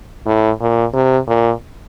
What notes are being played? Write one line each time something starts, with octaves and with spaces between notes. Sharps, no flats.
A2
A#2
C3
A#2